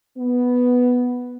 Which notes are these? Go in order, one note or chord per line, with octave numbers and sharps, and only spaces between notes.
B3